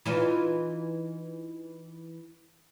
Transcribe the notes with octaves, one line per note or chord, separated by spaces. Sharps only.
E3 D#4 F4